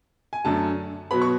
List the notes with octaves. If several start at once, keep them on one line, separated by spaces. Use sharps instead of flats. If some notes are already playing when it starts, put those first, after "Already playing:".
G#5
F#2 D3 A3 A5
B2 F#3 B3 B5
C#6